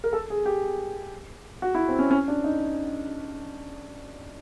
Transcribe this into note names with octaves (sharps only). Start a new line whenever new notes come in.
A#4
A4
G#4
G4
F#4
E4
C4
C#4
C#4
D4
D#4